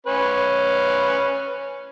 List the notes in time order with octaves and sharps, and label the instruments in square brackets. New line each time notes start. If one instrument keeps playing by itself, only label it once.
[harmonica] C#4 B4